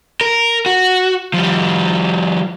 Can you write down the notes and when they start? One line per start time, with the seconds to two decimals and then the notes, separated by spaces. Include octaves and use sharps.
0.21 A#4
0.66 F#4
1.34 F3 G3